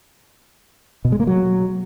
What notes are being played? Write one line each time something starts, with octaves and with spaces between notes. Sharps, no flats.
B2
G#3
A#3
F#3